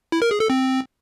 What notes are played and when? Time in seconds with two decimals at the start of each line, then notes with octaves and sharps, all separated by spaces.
0.12 E4
0.22 A#4
0.31 G#4
0.40 A4
0.50 C4